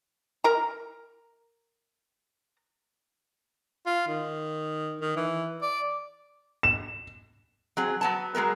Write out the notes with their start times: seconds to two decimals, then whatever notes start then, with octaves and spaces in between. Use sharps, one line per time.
0.44 A#4 A#5
3.86 F4
4.08 D#3
5.01 D#3
5.16 E3
5.62 D5
6.63 E7
7.77 F#3 C4 G#4
8.01 F#3 B3 A5
8.35 F#3 G#3 B3 A#4